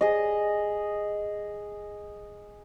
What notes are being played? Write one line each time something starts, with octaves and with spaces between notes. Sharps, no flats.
G#4 D#5